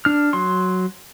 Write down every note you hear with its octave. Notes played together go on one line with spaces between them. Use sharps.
D4 F6
F#3 C6